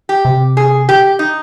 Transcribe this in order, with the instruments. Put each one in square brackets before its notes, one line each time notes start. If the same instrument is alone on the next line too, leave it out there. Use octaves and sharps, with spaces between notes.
[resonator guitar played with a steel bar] G4
[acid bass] C3
[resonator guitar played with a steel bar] G#4
G4
D#4